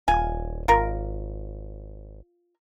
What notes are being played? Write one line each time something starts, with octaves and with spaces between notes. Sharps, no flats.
D#1 F4 G#5
G#1 F4 A#4